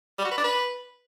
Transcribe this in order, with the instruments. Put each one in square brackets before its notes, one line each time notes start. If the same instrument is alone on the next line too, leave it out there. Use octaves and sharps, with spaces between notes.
[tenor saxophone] G3
F#4
B4
D4
B4